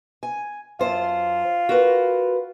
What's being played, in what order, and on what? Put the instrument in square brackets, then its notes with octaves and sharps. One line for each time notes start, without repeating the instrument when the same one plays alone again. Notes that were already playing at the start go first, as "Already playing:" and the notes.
[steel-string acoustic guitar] G#5
[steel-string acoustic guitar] F#2 C5 A5 [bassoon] F4
[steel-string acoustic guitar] F#4 A#4 B4